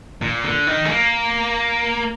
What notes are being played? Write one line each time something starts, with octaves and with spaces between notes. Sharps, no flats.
A#2
D3
D#3
G#3
A#3